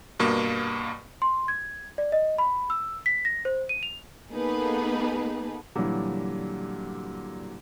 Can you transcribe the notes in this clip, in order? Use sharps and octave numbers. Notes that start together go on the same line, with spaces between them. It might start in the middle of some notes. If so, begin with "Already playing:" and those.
G2 B2 A#3
C6
G#6
D5
D#5
B5
E6
B6
A#6
C5
D#7
F7
A#3 B3 D#4 G#4 A4 B4
A#2 D3 E3 F#3 G3